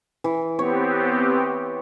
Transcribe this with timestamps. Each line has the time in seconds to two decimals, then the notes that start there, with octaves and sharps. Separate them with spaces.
0.24 E3
0.59 B3 C4 G4 C#5